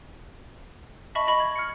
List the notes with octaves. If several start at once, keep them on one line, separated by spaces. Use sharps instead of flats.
D#5 E5 A5 B5 C#6
D#5 B5 C#6
G#6
F6 G#6 C#7